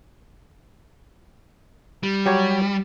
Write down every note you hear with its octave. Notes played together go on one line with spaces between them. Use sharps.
G3
F#3 G4 C#5